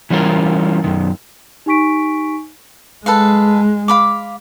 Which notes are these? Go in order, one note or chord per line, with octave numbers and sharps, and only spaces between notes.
E3 G3 C#4 F4 A#4
F#2 D#3
D#4 G4 G#5 C#6 B6 D7
G#3 A4 B4 F5
F5 B5 D6